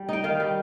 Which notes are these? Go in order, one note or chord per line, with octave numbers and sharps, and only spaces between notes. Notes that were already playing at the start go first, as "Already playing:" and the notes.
Already playing: G3
D#4 G5
D#3 F5
G3